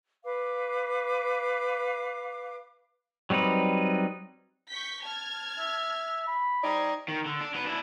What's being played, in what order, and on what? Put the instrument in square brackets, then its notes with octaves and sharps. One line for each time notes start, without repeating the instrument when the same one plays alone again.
[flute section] B4 F5 D6
[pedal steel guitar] F#3 G3 C4 D#4 B4
[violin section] C#6 G6 B6
A5 F6 G#6
[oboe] E5
B5
[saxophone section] G3 D#4 D5 [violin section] C5 G#6
[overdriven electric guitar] D#3
D3
D4
F#3 B4
D4 E4